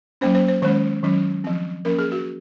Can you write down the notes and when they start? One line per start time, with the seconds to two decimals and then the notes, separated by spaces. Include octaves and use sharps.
0.21 F#3 A#3 C#4 C5
0.35 C5
0.49 C5
0.62 D#3 G#3 C#4 C5
1.03 D#3 F#3 C#4
1.44 F3 C4
1.85 F3 A#3 C#4 A#4
1.99 G#4
2.12 F#4